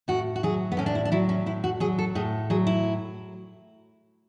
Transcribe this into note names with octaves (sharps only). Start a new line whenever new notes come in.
A2 F#4
F#4
F#3 G#4
B3
A2 C#4
D4
E4
D4
F#3 E4
C#4
A2 E4
F#4
F#3 G#4
A4
A2 G#4
F#3 G#4
E4